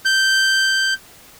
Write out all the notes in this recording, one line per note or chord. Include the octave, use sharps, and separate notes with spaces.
G6